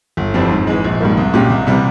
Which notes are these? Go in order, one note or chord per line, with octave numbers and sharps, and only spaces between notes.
G1
F2 E3 G3 C4
G#2
E3 G#3
A#1
G#2 G3 A#3
C2
A#2 G#3 C#4 G4
C2
C3 E3 G3